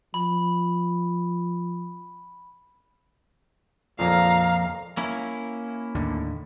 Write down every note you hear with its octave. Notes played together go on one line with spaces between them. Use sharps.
F3 B5
F2 A#2 F5 A#5
A#3 C#4 E4
D#2 A2 D3